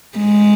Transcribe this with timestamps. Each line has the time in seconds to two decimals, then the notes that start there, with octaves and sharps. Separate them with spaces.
0.18 G#3